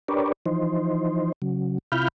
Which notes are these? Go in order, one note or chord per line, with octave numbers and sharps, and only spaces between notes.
D4 G4 A#4 B4 C#5 D5
E3 F3 D#4 C5
C#3 F#3
C3 E4 F4 B5 F6 G6